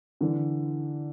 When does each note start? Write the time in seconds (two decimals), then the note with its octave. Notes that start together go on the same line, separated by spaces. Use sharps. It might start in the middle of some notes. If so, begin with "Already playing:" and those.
0.21 D3 E3